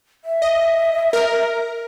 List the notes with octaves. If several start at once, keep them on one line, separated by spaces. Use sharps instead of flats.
E5
D#5
A#4